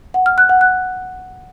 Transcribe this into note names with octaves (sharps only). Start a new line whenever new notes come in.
F#5
F6
F#6
F#5
F#6